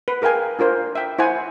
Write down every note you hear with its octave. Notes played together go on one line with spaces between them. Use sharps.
B4
G#4 A#4 F5 G5 G#5
D4 F4 A#4 C5
E5 G5
E4 C5 F#5 G#5